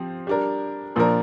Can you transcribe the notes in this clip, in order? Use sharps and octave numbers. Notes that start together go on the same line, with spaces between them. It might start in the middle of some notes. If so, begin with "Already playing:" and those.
Already playing: F3 C4 G4
G3 D4 A#4
A#2 F3 D4 A#4